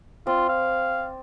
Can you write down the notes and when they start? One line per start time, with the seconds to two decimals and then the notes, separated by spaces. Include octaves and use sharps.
0.27 C4 F4 D5
0.49 F5